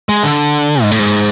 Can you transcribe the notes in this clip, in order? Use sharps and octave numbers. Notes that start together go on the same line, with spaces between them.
G#3
D3
G#2
A2
G#2